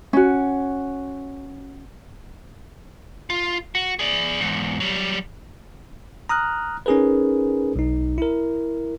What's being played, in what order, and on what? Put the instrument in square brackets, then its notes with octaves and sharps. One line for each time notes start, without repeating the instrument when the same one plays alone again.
[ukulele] C#4 F#4
[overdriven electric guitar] F4
F#4
G#4 D5
E2 G#2
F#3 G3
[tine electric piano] A#5 D#6 F6 F#6
C#4 D#4 G#4 A#4 B4
B1 D#4
E4 A#4